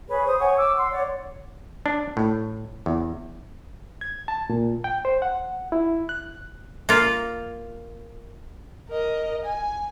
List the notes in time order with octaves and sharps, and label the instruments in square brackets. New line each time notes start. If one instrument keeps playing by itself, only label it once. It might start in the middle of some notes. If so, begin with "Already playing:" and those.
[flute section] G#4 B4 C#5
C5 D#6
C#5 F#5 G#5 C#6
D6 E6
F#5 C6
C#5 D5 F#5
[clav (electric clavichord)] D4
A2
E2
[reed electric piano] G#6
A5
A#2
G5
C5
F#5
E4
F#6
[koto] A#3 F4
[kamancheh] A#4 D#5
G#5